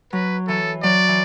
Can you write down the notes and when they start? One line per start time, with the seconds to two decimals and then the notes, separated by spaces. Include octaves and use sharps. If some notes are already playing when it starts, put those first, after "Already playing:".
0.13 F#3 B4
0.48 E3 A4
0.83 F#3 D5
1.08 E3